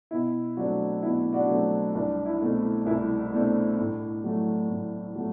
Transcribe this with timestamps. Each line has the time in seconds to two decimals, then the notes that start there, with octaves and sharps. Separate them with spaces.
0.11 B2 E4
0.57 F#3 A3 C4 D4 F#4
1.02 B2 E4
1.33 D4 F#4
1.48 F#3 A3 C4
1.94 C2 D4
2.25 E4
2.40 B2 A3 C4
2.86 C2 E4
3.32 B2 A3 C4 D4
3.77 A2
4.24 F#3 A3
4.69 A2
5.15 F#3 A3